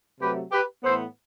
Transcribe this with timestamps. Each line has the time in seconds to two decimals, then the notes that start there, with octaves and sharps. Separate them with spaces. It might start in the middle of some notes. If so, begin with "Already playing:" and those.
0.20 C3 F#3 A3 G4 B4
0.52 G4 B4
0.84 A2 E3 B3 A4 C5